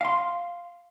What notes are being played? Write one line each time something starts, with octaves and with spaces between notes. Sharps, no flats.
F5 C6